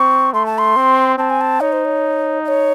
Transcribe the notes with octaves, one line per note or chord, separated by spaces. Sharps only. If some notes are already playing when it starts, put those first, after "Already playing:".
Already playing: C4 C#6
A3 C6
A5
C6
C4
C4 A5
G#5
A5
D#4 C#5
C5
C#5
D#5
C#5